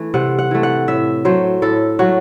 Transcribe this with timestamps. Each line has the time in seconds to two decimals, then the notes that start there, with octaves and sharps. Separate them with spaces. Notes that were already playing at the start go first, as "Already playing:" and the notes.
Already playing: E3 A3
0.14 C3 F#5
0.39 F#5
0.51 E3 A3
0.63 F#5
0.88 A2 E5
1.25 F#3 A3 C5
1.62 A2 A4
1.99 F#3 A3 F#4